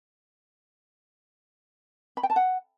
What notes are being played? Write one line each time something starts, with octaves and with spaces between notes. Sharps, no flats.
B5
G5
A5
F#5